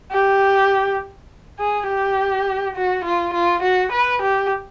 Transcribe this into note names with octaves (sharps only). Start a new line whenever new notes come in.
G4
G#4
G4
F#4
F4
F4
F#4
B4
G4